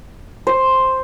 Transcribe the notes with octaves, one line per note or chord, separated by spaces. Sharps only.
C5